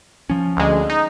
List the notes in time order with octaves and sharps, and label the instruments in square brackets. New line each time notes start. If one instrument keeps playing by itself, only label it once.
[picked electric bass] F3 C#4
[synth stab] D2 G#3
D#4